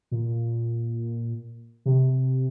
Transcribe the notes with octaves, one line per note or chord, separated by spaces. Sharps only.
A#2
C3